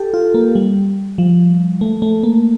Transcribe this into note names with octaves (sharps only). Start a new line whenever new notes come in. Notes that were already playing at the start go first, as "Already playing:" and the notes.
Already playing: G4 A4
F4
A#3
G3
F3
A3
A3
A#3